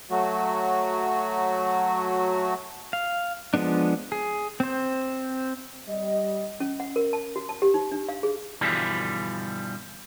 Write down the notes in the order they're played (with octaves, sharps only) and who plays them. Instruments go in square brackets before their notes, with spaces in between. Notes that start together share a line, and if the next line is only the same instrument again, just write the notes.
[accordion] F#3 A3 F#4
[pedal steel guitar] F5
F3 G#3 B3 D4
G#4
C4 C5
[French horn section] G3 D#5
[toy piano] C#4
F#5
A#4
A5
F#4
A5
G4
D#4
D4
F5
G#4
[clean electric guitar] G2 B2 D3 E3 F3 G3